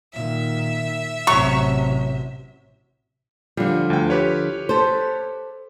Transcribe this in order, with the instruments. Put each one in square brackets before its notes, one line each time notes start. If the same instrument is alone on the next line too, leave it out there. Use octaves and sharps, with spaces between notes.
[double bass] A#2 D#3 [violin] E5
[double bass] A1 C3 [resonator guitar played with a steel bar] F#3 C#5 [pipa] C#6
[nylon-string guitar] D3 F3 [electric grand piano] G3
[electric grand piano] D2 G5
G4 B4 C#5
[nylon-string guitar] A4 C5